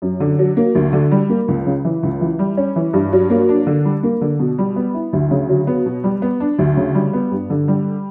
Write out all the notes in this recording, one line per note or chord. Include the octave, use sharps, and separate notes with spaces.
F#2
D3
F#3
A#3
D2
D3
G3
A#3
C#2
C#3
E3
C#2
E3
G3
C#4
E3
G2
F#3
A#3
D4
D3
G3
A#3
D3
B2
G3
B3
E4
D2
C#3
F#3
B3
B2
G3
B3
D4
D2
C#3
G3
B3
G2
D3
G3